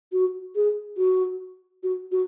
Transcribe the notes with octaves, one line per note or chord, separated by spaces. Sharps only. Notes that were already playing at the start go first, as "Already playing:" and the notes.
F#4
G#4
F#4
F#4
F#4